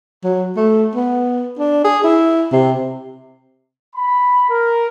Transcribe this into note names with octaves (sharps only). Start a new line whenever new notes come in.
F#3
A3
B3
D4
G#4
E4
C3
B5
A#4